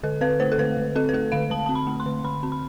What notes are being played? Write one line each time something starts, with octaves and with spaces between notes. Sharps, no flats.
D3 A4
C4 B4
A3 C5
A4
D3 B4
D3
C4 A4
B4
A3 A4
D3 F5
D3 A5
C4 A5
B5
A3
C6
D3
D3 B5
C4
B5